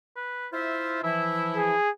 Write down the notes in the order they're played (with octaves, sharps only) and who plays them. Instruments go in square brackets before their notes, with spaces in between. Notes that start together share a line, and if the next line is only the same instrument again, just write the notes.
[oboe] B4
[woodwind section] E4 C5 E5 [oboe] F4
[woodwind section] E3 F3 E4 [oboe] E5
[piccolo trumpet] G#4